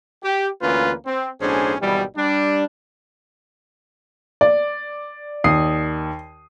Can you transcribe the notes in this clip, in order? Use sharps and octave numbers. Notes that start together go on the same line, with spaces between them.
G4
D2 E3 A#3 C#4 F4 B4
C4
B1 A2 C#4 D4 G#4 C5
G#1 B2 E3 G3
G3 D4
D5
D#2 D#6 C7